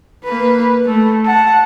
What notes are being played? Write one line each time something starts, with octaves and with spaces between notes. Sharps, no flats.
A#3 B4
A3
F#5 A5